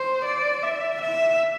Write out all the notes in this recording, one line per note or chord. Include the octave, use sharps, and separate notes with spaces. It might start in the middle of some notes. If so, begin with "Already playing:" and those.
Already playing: C5
D5
E5
E5